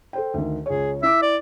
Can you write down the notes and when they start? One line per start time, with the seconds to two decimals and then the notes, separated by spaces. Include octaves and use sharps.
0.13 A4 C5 G5
0.34 D2 D#3
0.66 C#2 G#4 C#5
1.03 E4 E5 D6
1.22 D5